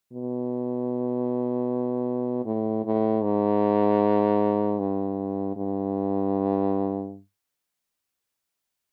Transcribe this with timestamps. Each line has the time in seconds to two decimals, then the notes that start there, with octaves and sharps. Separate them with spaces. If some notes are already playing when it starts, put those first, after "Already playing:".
0.13 B2
2.45 A2
2.85 A2
3.23 G#2
4.79 G2
5.56 G2